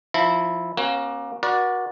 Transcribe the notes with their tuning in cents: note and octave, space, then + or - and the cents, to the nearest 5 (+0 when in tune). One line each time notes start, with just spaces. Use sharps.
F3 +0 E4 -10 A#5 -40
A#3 +25 C#4 -35 F#4 +20
F#4 -10 A#4 +45 D5 -5